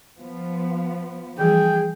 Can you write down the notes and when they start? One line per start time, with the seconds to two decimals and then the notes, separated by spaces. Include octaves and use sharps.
0.18 F3 B3
1.39 E3 F3 G3 G#4 G5